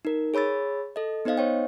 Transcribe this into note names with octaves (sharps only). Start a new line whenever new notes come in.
D#4 A#4
G#4 C#5 B5 E6 A6
A4 D#5
B3 D#4 C5 D#5 F5
C5 C#5 G5